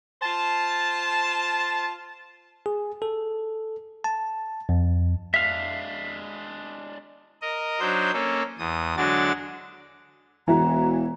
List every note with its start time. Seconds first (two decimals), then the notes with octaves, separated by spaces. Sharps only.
0.22 F4 C5 A5
2.66 G#4
3.02 A4
4.04 A5
4.69 F2
5.34 G#3 D4 E5 F5 B6
7.42 A#4 D#5
7.80 F#3 D4 D#4 C5 G6
8.13 A#3 C#4 A4
8.59 E2 D#6
8.97 D3 F#3 G#3 D4 F#4 A6
10.48 E1 E3 E4 F#4 A#5